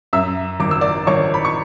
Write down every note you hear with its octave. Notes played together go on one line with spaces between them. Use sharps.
F#2 E5 E6
G#1 D6
E6
D5 D6
G#1 C#5 C#6
B5
C#6